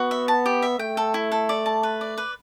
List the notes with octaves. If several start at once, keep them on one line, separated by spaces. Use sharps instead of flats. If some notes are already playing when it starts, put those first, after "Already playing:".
Already playing: B3 F#4
E5
A5
G4
E5
A3 G5
A4
E4
A4
D5
A5
B4
D5
B4